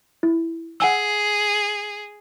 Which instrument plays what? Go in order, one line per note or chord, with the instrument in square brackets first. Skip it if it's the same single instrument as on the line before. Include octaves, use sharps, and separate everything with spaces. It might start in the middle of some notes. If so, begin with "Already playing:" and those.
[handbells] E4
[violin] G#4 [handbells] F#5 G#5 E6